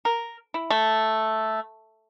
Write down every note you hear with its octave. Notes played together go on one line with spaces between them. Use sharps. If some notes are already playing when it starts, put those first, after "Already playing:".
A#4
E4
A3